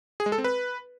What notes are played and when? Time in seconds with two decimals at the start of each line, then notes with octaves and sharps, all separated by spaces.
0.20 G#4
0.26 G#3
0.32 A4
0.38 C4
0.44 B4